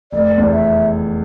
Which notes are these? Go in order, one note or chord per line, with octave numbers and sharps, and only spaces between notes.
F1 D5
E2
E5